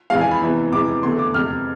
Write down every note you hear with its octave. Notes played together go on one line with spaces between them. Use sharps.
F2 E3 G#3 F5
G#5
B5
E2 C3 E3
F2 C3 E3 G#3 D6
E2 D3 A3 C6
D6
F2 C3 G#3 F6